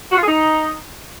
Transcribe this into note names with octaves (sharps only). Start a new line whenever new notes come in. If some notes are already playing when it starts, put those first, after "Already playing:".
F#4
F4
G#4
D#4